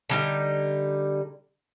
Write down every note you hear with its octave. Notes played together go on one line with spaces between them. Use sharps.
D3 G3 D#4